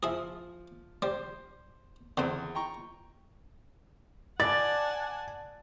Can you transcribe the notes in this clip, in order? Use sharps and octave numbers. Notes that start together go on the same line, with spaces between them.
F3 E4 G#4
G3 C5
E2 D3 C4
G5 A#5 C#6
D5 F#5 G#5 A5 A6